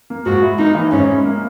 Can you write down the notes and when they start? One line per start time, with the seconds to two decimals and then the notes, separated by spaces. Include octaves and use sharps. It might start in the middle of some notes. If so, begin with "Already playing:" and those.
0.10 A#3
0.26 G#2 F#4
0.42 E4
0.58 A#3 D#4
0.75 E3
0.91 G#2 C#4
1.08 E4
1.25 A#3